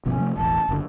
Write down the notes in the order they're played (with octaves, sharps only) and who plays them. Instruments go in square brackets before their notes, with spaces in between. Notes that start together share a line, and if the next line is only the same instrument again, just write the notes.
[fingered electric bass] G1 B2 F3 [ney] C#4
[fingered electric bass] C3 F3 A3
[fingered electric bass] E1 A1 [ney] A5
[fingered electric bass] F#1 D3